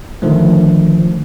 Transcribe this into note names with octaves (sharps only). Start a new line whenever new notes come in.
D3 D#3 F3 A3